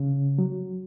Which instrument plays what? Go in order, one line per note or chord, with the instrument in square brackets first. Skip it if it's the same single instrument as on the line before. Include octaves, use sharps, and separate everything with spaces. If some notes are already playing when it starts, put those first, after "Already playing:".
Already playing: [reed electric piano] C#3
F#3